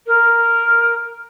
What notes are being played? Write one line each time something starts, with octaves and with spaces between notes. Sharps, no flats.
A#4